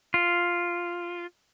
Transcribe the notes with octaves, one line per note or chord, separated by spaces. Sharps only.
F4